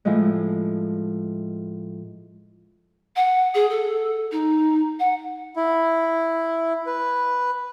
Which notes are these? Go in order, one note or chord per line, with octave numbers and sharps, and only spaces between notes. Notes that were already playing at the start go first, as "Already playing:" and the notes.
A2 F3 G#3
F#5
G#4
A4
D#4
F#5
E4
B4